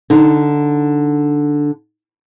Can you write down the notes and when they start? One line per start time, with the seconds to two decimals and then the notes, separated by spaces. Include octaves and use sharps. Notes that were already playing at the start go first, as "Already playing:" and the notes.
0.10 D3 D#4